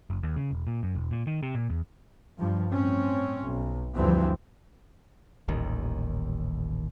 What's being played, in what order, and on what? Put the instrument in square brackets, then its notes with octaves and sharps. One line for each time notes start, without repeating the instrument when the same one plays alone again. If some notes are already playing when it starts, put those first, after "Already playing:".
[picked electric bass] F#1
D#2
C#3
E1
A#2
F#2
E1
A#2
D#3
C3
A#2
E2
[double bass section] G2 F3
A2 C4 C#4
B1
D2 G2 E3 F3 C4
[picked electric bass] D#1 A1 D#2 D#3